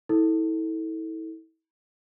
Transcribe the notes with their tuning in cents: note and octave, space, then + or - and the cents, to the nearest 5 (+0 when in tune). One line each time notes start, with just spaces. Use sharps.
E4 -35 A4 +0